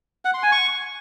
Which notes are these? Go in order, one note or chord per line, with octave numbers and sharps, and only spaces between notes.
F#5
C6
G#5
C#6